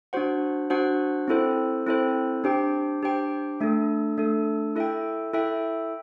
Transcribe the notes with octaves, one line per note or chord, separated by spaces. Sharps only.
D4 F#4 C5 F#5
D4 F#4 C5 F#5
C4 E4 A4 C5
C4 E4 A4 C5
D4 G4 C5 G5
D4 G4 C5 G5
A3 D4 A4
A3 D4 A4
E4 A4 E5 G5
E4 A4 E5 G5